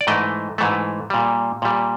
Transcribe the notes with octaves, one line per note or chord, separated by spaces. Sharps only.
D5
G#2 E3 A3 D#5
G#2 E3 A3
A#2 G3
A#2 G3